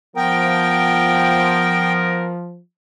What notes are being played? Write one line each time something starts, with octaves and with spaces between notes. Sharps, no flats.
F3 B3 A#4 G5